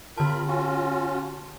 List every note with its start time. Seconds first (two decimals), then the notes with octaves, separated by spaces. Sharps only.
0.18 D3 F4 A#4 A5 B5
0.47 C#4 F4 F#4